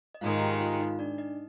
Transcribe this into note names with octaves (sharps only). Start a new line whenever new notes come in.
D#5
G#2 D#3 G#3 D#4 F4 F5
F5
G4 G5
F4 F5
D#4 D#5
D4 D5
D#4 D#5